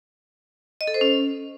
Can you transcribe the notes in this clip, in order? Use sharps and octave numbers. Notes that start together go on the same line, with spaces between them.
D#5
A4
C5
C#4